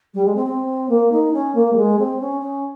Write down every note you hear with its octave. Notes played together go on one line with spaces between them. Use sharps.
G3
G#3
C4
C4
A#3
D#4
C#4
A#3
G3
G#3
C4
C#4
C#4